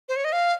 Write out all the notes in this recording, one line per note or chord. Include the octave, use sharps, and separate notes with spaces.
C5
C#5
D#5
F5